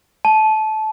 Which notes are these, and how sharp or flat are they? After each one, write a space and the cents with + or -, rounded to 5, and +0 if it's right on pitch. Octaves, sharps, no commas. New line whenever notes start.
A5 -20